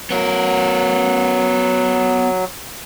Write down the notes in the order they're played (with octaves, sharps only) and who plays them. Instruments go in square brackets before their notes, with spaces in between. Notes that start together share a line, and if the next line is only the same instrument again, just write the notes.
[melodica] F#3 [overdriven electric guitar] B3 A#4